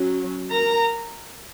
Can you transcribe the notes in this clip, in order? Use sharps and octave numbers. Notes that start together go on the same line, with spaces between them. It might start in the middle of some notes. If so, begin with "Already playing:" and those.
Already playing: F#3 C#4
A#4 A#5